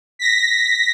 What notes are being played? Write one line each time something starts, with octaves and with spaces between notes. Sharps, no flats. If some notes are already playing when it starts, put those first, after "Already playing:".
A#6 B6